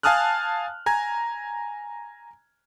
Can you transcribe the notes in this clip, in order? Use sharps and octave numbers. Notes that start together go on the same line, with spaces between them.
F5 G#5 A5 D#6 F6 F#6
G#5 A#5 G#6